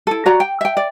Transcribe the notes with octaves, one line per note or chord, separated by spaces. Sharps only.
E4 A4
F#4 C#5 D5 A#5
G5
E5 G5
D5